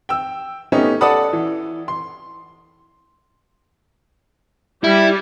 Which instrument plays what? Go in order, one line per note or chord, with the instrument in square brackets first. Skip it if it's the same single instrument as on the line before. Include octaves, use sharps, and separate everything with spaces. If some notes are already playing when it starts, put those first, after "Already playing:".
[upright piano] G5 E6
A3 B3 C#4 D#4 G4
A4 D5 F#5 A5 B5 D#6
E3
C6
[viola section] G3 [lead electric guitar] E4